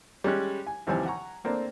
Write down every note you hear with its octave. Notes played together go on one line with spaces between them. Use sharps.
G3 G#3 C#4 F#6
G#5
D#2 C3 E3 F3 G3 G#5
F#5 G#5 A#5 C#6
A3 A#3 C4 D4